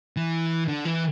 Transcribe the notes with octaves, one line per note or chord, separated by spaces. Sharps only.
E3
D3
E3